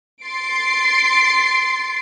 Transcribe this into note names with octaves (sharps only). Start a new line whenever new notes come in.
C6 A6 C7 D7